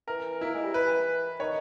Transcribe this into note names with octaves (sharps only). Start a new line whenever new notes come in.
E3 A#4
A#3 E4
G#3
G3
E3 B4
D#3 C#5